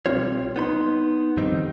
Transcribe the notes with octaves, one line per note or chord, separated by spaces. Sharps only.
B1 G3 C4 F4 C#5
B3 D#4 B5 C6
F2 D#3 G3 C4 D#4